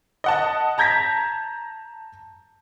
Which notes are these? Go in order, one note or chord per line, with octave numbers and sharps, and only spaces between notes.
D#5 F#5 A5
A5 A#5 G6 G#6 A#6 B6